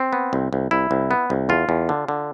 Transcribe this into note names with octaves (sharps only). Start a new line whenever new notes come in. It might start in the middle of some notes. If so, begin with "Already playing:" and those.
Already playing: C4
B3
C2
C2
C2 E4
C2
B3
C2
E2 F4
E2
D3
D3